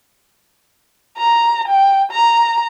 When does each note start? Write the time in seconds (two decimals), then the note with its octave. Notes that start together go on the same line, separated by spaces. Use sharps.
1.18 A#5
1.68 G5
2.12 A#5